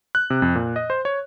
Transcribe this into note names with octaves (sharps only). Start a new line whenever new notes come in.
F#6
C3
F2
A#2
D#5
C5
C#5